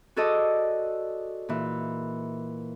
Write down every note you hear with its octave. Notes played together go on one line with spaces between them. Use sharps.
F#4 G#4 A4 C5 D5 D#5
A#2 E3